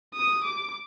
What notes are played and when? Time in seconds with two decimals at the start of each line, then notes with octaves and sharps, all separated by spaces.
0.14 D#6
0.43 D6